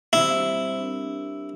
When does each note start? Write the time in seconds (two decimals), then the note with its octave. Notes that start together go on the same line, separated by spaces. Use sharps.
0.13 G3 C4 E4 G4 C5 E5
0.78 D4 G4 A#4